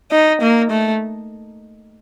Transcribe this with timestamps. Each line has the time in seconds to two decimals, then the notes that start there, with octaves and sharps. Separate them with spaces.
0.11 D#4
0.41 A#3
0.70 A3